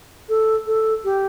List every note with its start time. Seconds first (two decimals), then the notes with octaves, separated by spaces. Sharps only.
0.29 A4
0.67 A4
1.04 G4